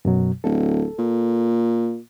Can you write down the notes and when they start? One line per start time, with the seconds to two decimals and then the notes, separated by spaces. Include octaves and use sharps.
0.05 F#2 B2 F#3
0.44 D1 A4
0.99 A#2